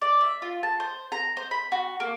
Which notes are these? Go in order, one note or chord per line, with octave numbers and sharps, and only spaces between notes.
D5
E5
F4
A5
C5
A#5
C5
B5
F#4
A#3